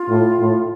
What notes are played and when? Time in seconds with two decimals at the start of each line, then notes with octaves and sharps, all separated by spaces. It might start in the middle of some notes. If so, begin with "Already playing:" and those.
Already playing: F4
0.09 A2
0.39 A2